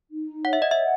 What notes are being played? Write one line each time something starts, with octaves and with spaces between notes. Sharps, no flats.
D#4
C#5 F#5
E5
D#5
E5
F#5